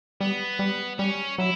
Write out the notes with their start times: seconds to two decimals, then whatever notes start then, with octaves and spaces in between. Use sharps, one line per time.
0.21 G3 B3
0.59 G3
0.99 G3 C#4
1.38 F#3 E4